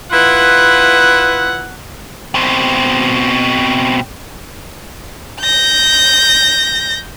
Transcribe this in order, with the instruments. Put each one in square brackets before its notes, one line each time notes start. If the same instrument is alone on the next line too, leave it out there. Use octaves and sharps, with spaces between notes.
[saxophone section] E4 F4 B4 [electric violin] F#5
[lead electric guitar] B2 C4
[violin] G6 A#6